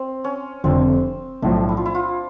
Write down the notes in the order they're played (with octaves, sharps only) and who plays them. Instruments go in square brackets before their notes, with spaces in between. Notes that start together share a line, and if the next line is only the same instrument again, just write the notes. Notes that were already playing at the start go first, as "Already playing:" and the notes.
Already playing: [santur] C4
C#4
[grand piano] F1 F2 D3 [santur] C4
[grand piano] B1 A2 F3 [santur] D4
[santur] E4
F4
E4
F4